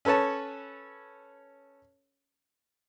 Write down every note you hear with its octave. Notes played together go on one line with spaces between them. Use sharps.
C#4 A4 B4 C#5 A5